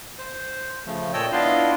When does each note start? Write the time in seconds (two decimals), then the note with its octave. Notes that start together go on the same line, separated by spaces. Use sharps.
0.18 C5
0.86 C#3 F3 A3
1.13 A#2 C#5 D#5 G5 A5 E6
1.32 B3 D4 E4 F4 D#5 F5